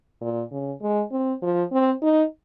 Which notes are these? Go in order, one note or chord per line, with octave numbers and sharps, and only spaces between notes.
A#2
C#3
G#3
C4
F3
C4
D#4